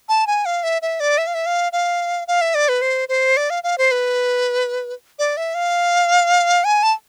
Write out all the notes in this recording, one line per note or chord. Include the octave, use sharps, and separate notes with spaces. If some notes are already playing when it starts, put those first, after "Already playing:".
A5
G#5
F5
E5
E5
D5
E5
F5
E5
F5
F5
F5
E5
D5
B4
C5
C5
D5
F5
F5
C5
B4
D5
E5
F5
G#5
A5